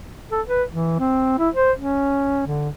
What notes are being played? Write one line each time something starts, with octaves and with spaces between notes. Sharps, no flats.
A4
B4
E3
C4
E4
C5
C#4
D3